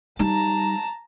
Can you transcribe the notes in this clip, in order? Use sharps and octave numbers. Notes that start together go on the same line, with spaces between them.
G3 D#4 A5 A#5